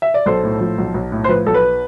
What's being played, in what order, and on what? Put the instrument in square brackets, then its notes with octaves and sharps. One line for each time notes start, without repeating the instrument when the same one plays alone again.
[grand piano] E5
D5
B1 A4 C5
A2
F3
B1
B1
A2
C5
F3 B4
B1 A4
B4